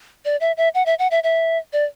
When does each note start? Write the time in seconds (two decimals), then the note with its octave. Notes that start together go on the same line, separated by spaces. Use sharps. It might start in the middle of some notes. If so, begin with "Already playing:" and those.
0.25 D5
0.41 E5
0.57 E5
0.75 F#5
0.86 E5
0.99 F#5
1.11 E5
1.23 E5
1.73 D5